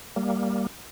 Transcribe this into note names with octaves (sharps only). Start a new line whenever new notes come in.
G3 A#3